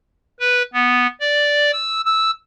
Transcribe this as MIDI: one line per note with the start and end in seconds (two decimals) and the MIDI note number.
0.40 0.63 71
0.73 1.07 59
1.20 1.71 74
1.73 2.02 88
2.05 2.31 88